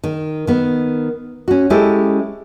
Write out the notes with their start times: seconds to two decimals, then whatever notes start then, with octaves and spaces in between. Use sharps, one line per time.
0.04 D#3
0.47 D#3 B3
1.48 C#4 F#4
1.70 G#3 C#4 E4 G4 A4